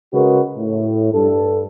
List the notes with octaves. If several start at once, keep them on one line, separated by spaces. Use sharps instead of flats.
C#3 G#3 F#4 G#4 A#4 B4
A2
G2 A4